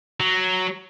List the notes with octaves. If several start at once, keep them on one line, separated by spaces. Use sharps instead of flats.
F#3